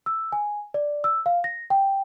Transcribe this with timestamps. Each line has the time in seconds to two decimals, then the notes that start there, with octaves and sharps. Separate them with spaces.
0.06 E6
0.32 G#5
0.74 D5
1.04 E6
1.26 F5
1.44 A#6
1.70 G5